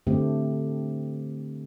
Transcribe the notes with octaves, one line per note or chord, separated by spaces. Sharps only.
D3 A3 C4 G4